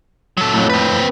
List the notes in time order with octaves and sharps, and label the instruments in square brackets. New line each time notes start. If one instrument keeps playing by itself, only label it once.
[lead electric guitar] F#3 A4
[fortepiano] F2 A2
[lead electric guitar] C4 B4